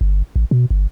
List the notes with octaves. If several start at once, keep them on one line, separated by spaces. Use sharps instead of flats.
G1
A1
B2
G1